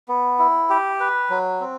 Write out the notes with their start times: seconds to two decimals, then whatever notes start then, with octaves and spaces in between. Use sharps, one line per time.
0.09 B3
0.39 E4
0.70 G4
1.00 B4
1.30 F#3
1.61 C4